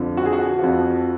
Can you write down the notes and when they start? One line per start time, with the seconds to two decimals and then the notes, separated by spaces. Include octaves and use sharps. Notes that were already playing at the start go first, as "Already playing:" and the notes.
Already playing: F2 D3 F3
0.17 F#4
0.26 G#4
0.33 F#4
0.59 F2 F3